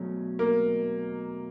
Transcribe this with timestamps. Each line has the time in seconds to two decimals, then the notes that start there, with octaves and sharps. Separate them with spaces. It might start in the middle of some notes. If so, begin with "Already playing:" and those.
Already playing: B2 F#3 A3 C#4
0.39 A#3